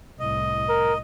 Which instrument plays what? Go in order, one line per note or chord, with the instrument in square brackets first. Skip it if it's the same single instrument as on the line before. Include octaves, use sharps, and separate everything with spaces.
[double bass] C2 A2 [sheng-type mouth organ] D#5
[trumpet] A#4